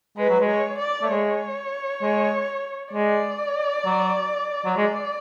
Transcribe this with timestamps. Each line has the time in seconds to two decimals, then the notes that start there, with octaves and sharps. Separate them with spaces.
0.17 G#3 B4
0.29 F#3
0.41 G#3
0.49 C#5
0.79 D5
1.02 A3
1.10 G#3 C#5
2.02 G#3
2.93 G#3 D5
3.85 F#3
4.65 F#3
4.77 G#3 D5